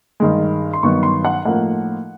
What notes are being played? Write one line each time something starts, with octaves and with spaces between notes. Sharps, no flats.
G2 D#3 G#3
C6
G2 D#3 F#3 B3 C#6
C6
F#5
A2 F3 A#3 D#4 F#5